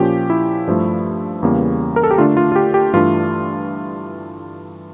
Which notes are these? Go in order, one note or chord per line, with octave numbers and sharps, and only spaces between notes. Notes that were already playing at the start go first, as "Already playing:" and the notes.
Already playing: A#2 F3 C#4 G4
E4
G2 F3 A3
E2 C#3 E3 G3 A#3
A#4
A4
G4
D3 A3 D4 F4
F4
F4
G4
G4
G2 E3 A3 D4 F4